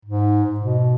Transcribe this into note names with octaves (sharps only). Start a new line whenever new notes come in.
G#2
B2